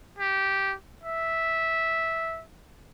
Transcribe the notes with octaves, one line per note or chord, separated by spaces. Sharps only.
G4
E5